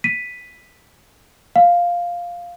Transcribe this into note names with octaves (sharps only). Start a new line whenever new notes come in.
B6 D#7
F5